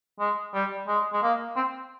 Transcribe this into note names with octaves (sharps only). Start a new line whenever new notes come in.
G#3
G3
G#3
G#3
A#3
C4